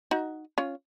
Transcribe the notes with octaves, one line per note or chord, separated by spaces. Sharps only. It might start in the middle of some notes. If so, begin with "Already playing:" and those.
D#4 F#4
C#4 F4